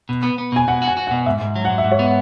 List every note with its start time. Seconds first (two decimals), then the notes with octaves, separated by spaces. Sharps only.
0.09 B2
0.23 B3
0.38 B3
0.52 B2 G#5
0.68 B2 F#5
0.82 F#4
0.88 G#5
0.97 F#4
1.07 F#5
1.11 B2
1.26 G#2 E5
1.41 G#2
1.55 F#3
1.65 F#5
1.70 G#2
1.78 E5
1.84 G#2
1.92 C#5
1.99 B3
2.04 E5